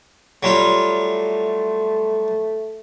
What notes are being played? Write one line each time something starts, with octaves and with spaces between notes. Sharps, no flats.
F#3 G3 A3 F4